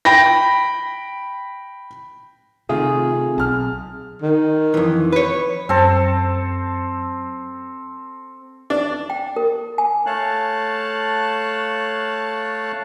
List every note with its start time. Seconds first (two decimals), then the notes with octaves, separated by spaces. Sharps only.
0.05 G5 B5 A#6
2.69 C3 D#3 A3 C4 F4 G#4
3.38 B1 A5 F6
4.22 D#3
4.74 F2 E3
5.12 B4 C#5
5.69 F#2 C4 A4
8.70 D4
9.10 G5
9.36 A#4
9.78 G#5
10.06 A3 C#5 F5 A5 F#6